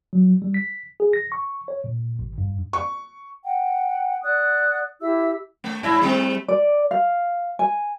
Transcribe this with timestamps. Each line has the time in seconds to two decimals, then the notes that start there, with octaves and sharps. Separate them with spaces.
0.13 F#3
0.42 G3
0.54 B6
1.00 G#4
1.13 A#6
1.32 C#6
1.68 C#5
1.84 A#2
2.19 G#1
2.38 G2
2.73 C#6
3.44 F#5 G5
4.24 D5 F#5 D#6 F#6
5.01 E4 G4 E5 E6
5.64 A3
5.83 G#2 E4 E5
6.01 G3 A3 C4
6.48 D5
6.91 F5
7.59 G#5